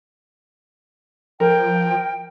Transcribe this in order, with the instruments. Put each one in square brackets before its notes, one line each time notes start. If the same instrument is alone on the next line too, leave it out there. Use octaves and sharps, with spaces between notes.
[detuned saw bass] F3 [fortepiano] A#4 [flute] G5